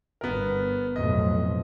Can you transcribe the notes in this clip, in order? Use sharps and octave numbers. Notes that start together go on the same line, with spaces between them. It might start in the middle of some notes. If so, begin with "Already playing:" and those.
G1 B3 A#4
B1 F2 A2 D#5